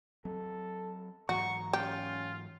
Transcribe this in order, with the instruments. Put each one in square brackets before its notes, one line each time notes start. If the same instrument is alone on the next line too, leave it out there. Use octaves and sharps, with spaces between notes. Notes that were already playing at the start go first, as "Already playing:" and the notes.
[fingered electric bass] F#3 C4 [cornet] A4
[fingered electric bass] G#2 E3 F#3 [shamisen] F#4 [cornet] A#5 [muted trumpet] C#6
[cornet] C#4 [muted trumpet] F4 [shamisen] G4